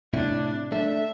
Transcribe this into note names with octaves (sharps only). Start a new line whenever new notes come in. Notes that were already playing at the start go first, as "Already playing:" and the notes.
A2 C3 D4 E4
A3 D4 E5